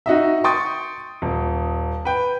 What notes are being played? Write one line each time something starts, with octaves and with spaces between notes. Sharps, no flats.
D#4 F#4 D#5 E5
G5 C6 C#6 D#6 A6
D#1
B4 G5